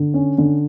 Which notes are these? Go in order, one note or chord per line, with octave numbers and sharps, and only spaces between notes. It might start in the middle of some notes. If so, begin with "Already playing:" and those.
Already playing: D3
C#4
D3